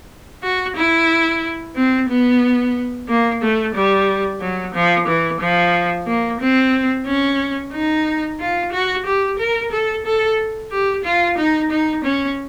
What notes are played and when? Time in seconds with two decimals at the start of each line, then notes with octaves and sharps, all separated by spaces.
0.43 F#4
0.76 E4
1.76 C4
2.09 B3
3.08 A#3
3.42 A3
3.75 G3
4.40 F#3
4.74 F3
5.07 E3
5.40 F3
6.06 A#3
6.40 C4
7.07 C#4
7.73 D#4
8.39 F4
8.72 F#4
9.05 G4
9.39 A#4
9.71 A4
10.05 A4
10.71 G4
11.04 F4
11.37 D#4
11.70 D#4
12.04 C#4